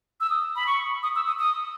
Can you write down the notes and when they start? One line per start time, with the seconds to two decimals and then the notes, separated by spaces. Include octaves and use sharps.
0.21 E6
0.30 D#6
0.56 B5
0.67 C#6
1.03 D#6
1.16 E6
1.27 D#6
1.39 D#6